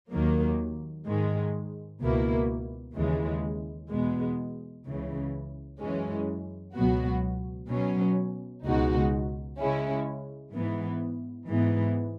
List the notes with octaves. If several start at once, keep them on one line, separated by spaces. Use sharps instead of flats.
D#2 D#3 F#3 A#3
G#2 D#3 G#3
C#2 B2 A#3 E4
D#2 C#3 E3 G#3
E2 B2 G#3 B3
C#2 C#3 E3
F#2 E3 G#3 C#4
C#2 B2 F#3 B3 F#4
B2 F#3 C#4
C#2 B2 G#3 D#4 F#4
C#3 G#3 C#4 E4
G#2 E3 B3
G#2 E3 B3